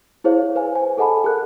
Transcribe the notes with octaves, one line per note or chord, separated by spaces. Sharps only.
E4 G#4 C5 C#5 F5
B4 C5 F5 G#5
G#5
G#4 A4 D#5 F#5 A5 B5
G#4 A#4 F#6